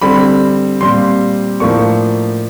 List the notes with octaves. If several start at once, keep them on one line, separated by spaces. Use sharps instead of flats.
D3 G3 C4 B5
A#2 G3 C4 C6
A2 F3 A#3 D4 C#6